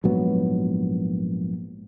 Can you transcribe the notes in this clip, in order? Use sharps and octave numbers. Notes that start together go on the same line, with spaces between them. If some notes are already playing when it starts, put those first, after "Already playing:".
A#1 G#2 F#3 B3